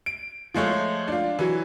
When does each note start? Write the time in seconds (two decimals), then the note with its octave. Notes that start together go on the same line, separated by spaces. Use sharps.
0.06 D7
0.54 F3 G#3 A3 C#5
1.08 D4 F4
1.39 E3 F#3